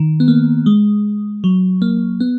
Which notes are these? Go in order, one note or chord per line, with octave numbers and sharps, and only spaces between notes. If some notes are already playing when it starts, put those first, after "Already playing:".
Already playing: D#3
B3
A#3
G#3
F#3
A#3
B3